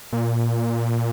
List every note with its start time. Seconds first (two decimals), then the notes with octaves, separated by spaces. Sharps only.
0.13 A#2